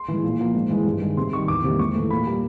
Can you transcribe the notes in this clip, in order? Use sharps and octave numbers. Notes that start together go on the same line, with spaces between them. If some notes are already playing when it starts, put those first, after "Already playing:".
Already playing: C6
E3 G#3
A#2
F3 A#3
G#2
E3 G#3
G2
D#3 G#3
C3 C6
D#3 G3 C#6
E2 D6
C3 D#3 G3 A#3
G#2 C#6
E3 A3
A#2 B5
G3 A#3